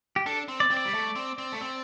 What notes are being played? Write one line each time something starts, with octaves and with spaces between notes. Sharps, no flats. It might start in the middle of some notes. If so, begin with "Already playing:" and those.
G4
D4 A4
C4
D5
C4
D5
G3
A3
C4
C4
A3
C4